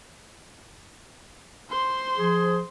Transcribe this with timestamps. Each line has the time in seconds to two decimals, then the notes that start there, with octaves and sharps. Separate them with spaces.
1.70 C5 C6
2.18 F3 G#4